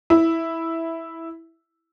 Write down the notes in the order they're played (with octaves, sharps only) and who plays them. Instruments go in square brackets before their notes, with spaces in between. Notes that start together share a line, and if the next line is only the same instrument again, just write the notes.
[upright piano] E4